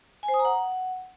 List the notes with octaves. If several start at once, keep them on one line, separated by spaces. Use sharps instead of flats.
G#5
C5
D#6
A#5
F#5